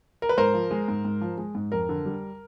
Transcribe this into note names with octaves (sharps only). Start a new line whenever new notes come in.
A#4
B4
G#2 A#4 C5
F3
G#3
G#2
G#2
F3
G#3
G#2
F2 A#4
D3
G3